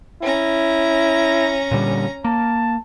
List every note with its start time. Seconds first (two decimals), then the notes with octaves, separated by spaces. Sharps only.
0.22 C#4 E4 A#5
1.71 A#2 D3 G3
2.24 A#3 A5